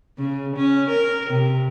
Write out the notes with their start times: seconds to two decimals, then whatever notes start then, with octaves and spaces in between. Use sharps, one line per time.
0.19 C#3
0.56 C#4
0.89 A#4
1.29 C3